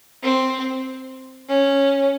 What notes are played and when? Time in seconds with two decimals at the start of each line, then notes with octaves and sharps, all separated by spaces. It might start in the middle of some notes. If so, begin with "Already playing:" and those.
0.23 C4
1.49 C#4